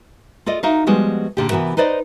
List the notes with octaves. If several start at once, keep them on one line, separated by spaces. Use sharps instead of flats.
F4 A4 D5 D#5
D#4 F#4 A#4 E5 F5
F3 G3 G#3 B3 F#4
A#2 D3 G4
C3 E3 B3 F#4 A#4
D#4 B4 C5 D5 D#5